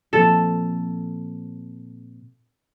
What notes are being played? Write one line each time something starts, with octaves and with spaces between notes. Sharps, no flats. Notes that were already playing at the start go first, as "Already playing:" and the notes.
A#2 F3 C4 A4